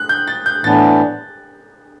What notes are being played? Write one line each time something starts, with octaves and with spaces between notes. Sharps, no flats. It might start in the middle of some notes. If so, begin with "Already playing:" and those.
Already playing: F#6
G6
A6
G6
A2 E3 B3 D4 A6